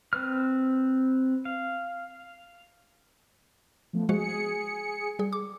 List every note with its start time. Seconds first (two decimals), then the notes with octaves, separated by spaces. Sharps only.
0.13 C4 B4 F6
1.45 F5
3.93 F3 A3 B3
4.09 F3 G#3 F#4 G#4 C#7
5.19 G3 G#4
5.33 D6